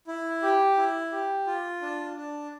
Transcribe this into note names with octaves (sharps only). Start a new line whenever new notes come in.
E4
G4
E4
G4
F4
D4
D4